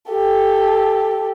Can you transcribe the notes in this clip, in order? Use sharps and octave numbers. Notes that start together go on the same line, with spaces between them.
G4 A4